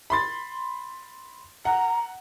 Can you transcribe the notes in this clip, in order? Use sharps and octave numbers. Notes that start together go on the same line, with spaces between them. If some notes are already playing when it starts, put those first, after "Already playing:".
B5 C6 A6
F#5 A#5